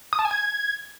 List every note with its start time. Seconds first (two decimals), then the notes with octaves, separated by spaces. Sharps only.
0.13 D#6
0.19 A5
0.25 G#5
0.31 G#6